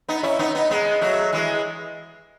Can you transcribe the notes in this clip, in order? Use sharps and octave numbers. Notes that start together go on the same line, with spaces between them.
B3 D#4
C#4 E4
B3 D#4
B3 D#4
G#3 B3
F#3 A3
E3 G#3